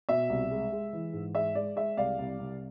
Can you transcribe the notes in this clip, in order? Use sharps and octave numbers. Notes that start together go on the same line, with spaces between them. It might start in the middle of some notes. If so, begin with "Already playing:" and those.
B2 E5
C2
G#3
G#3
E3
G#2
G#3 E5
G#3 D5
G#3 E5
C2 D5 F5
C2
C2